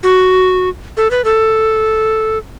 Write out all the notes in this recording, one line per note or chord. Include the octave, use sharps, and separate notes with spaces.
F#4
A4
B4
A4